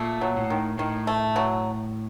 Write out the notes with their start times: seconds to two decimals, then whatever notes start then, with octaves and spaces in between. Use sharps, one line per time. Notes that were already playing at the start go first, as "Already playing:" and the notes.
Already playing: A#2 A3
0.21 F#3
0.36 A2
0.50 D#3
0.78 A2 D#3
1.07 A3
1.36 F#3